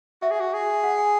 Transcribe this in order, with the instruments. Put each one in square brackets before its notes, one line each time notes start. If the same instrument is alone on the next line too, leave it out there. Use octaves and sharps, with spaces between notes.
[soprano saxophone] F#4 [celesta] E5
[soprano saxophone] G#4
F#4
G#4
[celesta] F#5
G#5